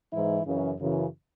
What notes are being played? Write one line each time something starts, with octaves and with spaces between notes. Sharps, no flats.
G#2 E3 E4
F#2 C#3 E3
F#2 C#3 E3